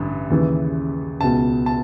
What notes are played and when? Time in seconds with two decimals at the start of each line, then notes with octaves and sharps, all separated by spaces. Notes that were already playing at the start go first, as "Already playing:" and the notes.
Already playing: A1 G2 D3
0.30 D#2 C#3 E3
1.21 C#2 B2 A5
1.66 A5